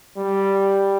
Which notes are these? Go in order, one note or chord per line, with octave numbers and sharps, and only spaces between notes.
G3